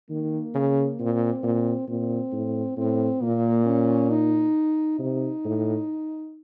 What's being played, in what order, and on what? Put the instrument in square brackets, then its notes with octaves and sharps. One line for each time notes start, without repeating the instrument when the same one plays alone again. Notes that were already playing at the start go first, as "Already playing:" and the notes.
[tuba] D#3 [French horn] A#3
[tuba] C#3
[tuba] A#2 [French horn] C4
[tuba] A#2
[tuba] A#2 [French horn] C4
[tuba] A2
[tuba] A2 [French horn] C4
[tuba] A#2 [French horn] A#3
[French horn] C#4
D#4
[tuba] C3 [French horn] D#4
[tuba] A2